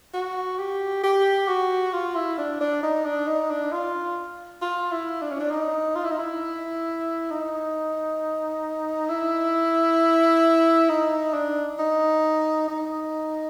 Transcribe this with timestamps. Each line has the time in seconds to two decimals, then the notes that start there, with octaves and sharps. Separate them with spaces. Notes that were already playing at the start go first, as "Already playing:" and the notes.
0.14 F#4
0.59 G4
1.04 G4
1.48 F#4
1.93 F4
2.16 E4
2.38 D4
2.61 D4
2.83 D#4
3.05 D4
3.28 D#4
3.50 D4
3.72 F4
4.62 F4
4.92 E4
5.22 D4
5.31 C#4
5.40 D4
5.52 D#4
5.96 F4
6.04 E4
6.12 D#4
6.19 E4
7.31 D#4
9.10 E4
10.89 D#4
11.34 D4
11.79 D#4
12.68 D#4